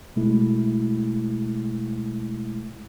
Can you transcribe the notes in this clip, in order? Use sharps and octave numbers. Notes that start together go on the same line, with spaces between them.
B2 G#3 A3 E4